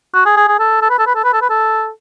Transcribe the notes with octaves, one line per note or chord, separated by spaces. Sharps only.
F#4
G#4
G#4
G#4
A4
A4
B4
A4
B4
A4
B4
A4
B4
A4